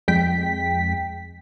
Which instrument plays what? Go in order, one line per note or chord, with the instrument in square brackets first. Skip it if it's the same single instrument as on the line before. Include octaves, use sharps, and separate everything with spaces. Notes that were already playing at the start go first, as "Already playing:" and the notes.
[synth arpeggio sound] F2 G#3 G5 B6